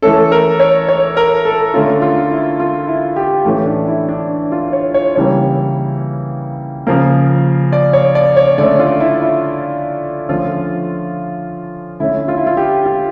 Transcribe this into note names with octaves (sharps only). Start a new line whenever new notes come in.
E3 A3 C#4 A4
A#4
C#5
C#5
A#4
A4
D3 A3 C#4 F4
F4
E4
F4
E4
G4
A2 E3 A3 C#4
D4
E4
D4
F4
C#5
C#5
C#3 E3 G3 A#3 C#5
C#3 F3 A#3
D5
C#5
D5
C#5
D3 A3 C#4 D5
F4
E4
E4
D3 F3 A3 C#4 F4
D3 A3 C#4 E4
F4
E4
F4
G4
F4